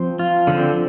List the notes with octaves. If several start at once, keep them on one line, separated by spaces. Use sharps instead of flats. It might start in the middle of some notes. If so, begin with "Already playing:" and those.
Already playing: F3 C4
F4
D3 F3 C4